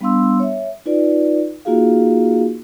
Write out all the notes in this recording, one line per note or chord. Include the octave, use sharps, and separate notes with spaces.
G3 B3 D4 F5 C6 E6
C#5 E5
D#4 F4 B4 D5
A#3 D#4 F4 F#4 G#4 F5